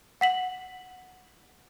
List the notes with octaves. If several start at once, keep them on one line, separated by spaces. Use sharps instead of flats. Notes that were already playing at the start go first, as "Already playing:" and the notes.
F#5 B6 F#7